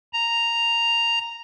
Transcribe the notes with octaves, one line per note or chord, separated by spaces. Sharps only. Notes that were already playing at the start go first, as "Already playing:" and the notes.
A#5